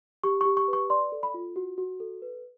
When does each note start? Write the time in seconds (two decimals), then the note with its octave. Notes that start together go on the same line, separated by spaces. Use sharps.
0.24 G4 C#6
0.41 C#6
0.45 G4
0.57 C#6
0.68 B4
0.73 C#6
0.90 D5 C6
1.12 A4
1.23 B5
1.34 F4
1.56 F#4
1.78 F#4
2.00 A4
2.22 B4